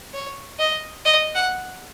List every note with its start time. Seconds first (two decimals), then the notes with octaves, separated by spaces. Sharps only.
0.13 C#5
0.59 D#5
1.05 D#5
1.35 F#5